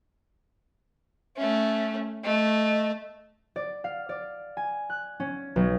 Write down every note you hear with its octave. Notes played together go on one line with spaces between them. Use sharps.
A3 C#4 E5
A3 D#5
D5
F5
D5
G#5
F#6
C#4
B1